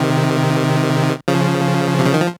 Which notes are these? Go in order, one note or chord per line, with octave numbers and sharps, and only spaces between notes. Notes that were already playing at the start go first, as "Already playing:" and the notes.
Already playing: C3 D#3
C#3 F3
C3
C#3
D#3
F3